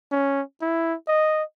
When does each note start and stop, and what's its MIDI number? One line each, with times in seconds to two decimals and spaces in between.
0.12 0.42 61
0.62 0.95 64
1.08 1.43 75